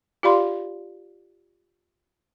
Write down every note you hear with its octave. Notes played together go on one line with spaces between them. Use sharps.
F4 G4 D5 F5 B5 C6